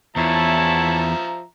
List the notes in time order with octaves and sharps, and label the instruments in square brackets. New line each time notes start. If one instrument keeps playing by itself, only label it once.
[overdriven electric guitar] E2 [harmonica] F3 E5 A#5 [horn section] E4 C#5 A5